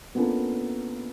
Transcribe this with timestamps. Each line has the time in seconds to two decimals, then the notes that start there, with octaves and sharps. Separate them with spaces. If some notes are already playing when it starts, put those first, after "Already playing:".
0.15 A#3 B3 C#4 D4 F4 A4